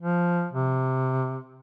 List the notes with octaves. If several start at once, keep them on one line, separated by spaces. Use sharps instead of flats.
F3
C3